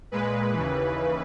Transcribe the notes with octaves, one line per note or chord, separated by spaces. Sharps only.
A#2 G#3 B4
D#2 C#3 E3